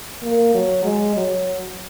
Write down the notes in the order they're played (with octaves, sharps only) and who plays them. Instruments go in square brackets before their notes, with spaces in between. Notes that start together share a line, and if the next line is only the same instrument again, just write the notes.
[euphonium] A#3
F#3
G#3
F#3